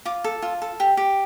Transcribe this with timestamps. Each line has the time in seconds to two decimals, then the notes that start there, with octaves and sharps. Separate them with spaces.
0.05 F4 D6
0.24 A4
0.42 F4
0.62 A4
0.80 G4
0.97 G4